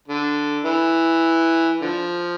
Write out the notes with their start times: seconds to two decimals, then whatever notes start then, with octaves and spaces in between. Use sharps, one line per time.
0.08 D3
0.65 E3
1.81 D3 F3